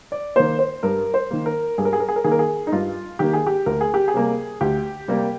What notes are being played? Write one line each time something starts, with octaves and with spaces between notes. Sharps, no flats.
D5
D#3 A#3 C5
C5
G2 A#4
C5
D#3 A#3
A#4
G2 G#4
A#4
G#4
A#4
G#4
A#4
D#3 A#3 G#4
A#4
G#4
D#4
G2 F4
D#3 A#3 G4
G#4
G4
D2 A#4
G#4
G4
G#4
C3 G3 A#3
D2 G4
C3 G3 A#3